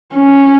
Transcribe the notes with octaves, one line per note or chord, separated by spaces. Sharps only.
C#4